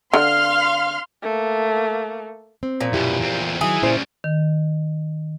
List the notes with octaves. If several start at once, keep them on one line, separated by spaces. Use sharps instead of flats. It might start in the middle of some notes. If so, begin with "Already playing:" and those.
D3 F5 C6 F6
A3 A#3
C4
A#2 F3
F#2 B2 E4 G4
E2 C4
D#3 E3 F#3 G#4
A#2 C#3 G3 E4 C5
D#3